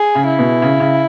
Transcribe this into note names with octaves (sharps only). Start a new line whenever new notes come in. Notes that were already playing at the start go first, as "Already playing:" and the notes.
Already playing: G#4
C#3
E4
B2
C#3
C#3